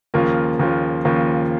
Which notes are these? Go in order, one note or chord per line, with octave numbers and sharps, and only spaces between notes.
D#2 C#3 F3 A#3 F4
D#2 C#3 F3 A#3 F4
D#2 C#3 F3 A#3 F4